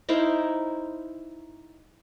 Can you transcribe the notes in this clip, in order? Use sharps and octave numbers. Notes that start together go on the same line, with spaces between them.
D#4 E4 A#4 C5